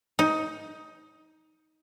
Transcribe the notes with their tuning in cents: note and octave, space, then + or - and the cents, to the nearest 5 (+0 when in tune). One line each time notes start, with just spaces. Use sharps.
D#4 +15